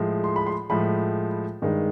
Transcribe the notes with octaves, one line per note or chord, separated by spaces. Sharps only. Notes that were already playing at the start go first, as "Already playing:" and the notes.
Already playing: A2 F3 G#3
C6
B5
C6
A2 F3 G#3 B5
G2 D#3 G#3